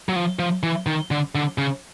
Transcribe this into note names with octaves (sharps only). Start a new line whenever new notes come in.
F#3
F3
F3
E3
D#3
D3
D3
C#3